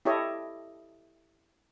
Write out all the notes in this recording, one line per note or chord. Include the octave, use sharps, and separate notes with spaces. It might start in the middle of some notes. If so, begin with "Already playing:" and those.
E4 G4 A4 C#5 D#5